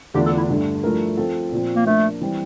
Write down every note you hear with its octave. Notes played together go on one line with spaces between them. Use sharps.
E2 D3 A3 D4 F4 G4
A4
E4
G2 D3 A3
G2 F3 A3 E4 A#4
F3 C4 F4 A4
A#2 F3 C4
A#3
F3 A3 A#3 D4 F4
E3 G3 C4